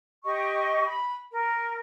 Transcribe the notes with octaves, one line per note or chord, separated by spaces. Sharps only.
G4 D#5 C#6
B5
A#4